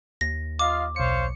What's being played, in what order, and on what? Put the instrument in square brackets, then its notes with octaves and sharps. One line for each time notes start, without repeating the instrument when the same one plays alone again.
[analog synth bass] D#2 [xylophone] A#6
[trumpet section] F4 D#5 F5 [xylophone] D6
[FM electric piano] B1 C#7 [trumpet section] C5 C#5 F5